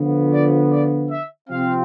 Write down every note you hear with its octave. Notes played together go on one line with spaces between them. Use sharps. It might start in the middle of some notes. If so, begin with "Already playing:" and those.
Already playing: D3 F3 B3
D5
D5
E5
C3 F3 C4 F5